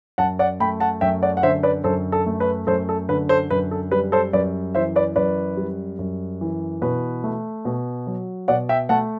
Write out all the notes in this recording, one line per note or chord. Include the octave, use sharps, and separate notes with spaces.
F#2 F#5 A5
D5 F#5
A3 G5 B5
F#5 A5
F#2 E5 G5
D5 F#5
F#5
D3 C5 E5
B4 D5
F#2 A4 C5
A4
A3
B4
F#2 A4 C5
A4
D3 B4
A4 C5
F#2 B4
A4
G3 B4
A4 C5
F#2 B4 D5
E3 C5 E5
B4 D5
F#2 B4 D5
G3
F#2
E3
B2 B4
A3
B2
F#3
B2 D5 F#5
E5 G5
A3 F#5 A5